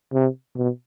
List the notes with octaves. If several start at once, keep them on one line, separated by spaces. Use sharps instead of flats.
C3
B2